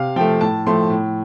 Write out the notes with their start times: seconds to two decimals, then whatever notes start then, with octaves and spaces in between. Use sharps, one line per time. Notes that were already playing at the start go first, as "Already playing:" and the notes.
Already playing: C3 F5
0.16 F3 A3 G5
0.41 A2 A5
0.67 F3 A3 C6
0.90 A2